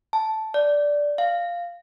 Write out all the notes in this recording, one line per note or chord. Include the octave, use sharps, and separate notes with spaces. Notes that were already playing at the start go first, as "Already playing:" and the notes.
A5
D5
F5